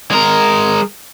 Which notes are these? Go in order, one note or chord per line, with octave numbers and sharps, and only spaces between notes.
G#3 A#4